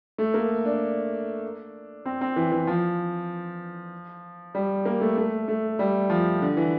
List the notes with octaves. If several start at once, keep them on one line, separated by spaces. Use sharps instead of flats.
A3
A#3
D4
C4
C4
E3
E3
F3
G3
A#3
A3
A3
A3
G3
F3
D3
E3